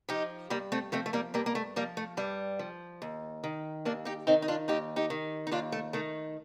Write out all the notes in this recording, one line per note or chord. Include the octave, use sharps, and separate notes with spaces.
F3 D#4 G4
G2 G3 A#3
A3 C4
F3 A3 C4
A3
G3 A#3
G2 G3 A#3
A#3
A3
F3 G3 A#3
A3
G2 G3
F3
D#2
D#3
D#2 A#3 D4
D#4 G4
D#3 C4 D#4
D#4
D4 F4
D#2 D#4 G4
D#4 G4
D#3
D#4
D#2 D4 F4
A3
D#3 A3